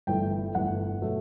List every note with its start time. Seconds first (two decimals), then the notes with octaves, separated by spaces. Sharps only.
0.07 G1 G2 E3 A3 G5
0.55 G1 G2 E3 A3 F#5
1.01 B2 F#3 A3